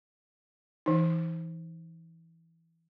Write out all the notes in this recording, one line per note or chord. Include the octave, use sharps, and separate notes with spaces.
E3 D#4